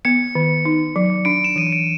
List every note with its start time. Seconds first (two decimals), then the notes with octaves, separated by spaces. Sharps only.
0.05 B3 C#7
0.35 D#3
0.65 D#4
0.96 F#3
1.25 D4 D7
1.44 E7
1.56 E3 D#7
1.73 D7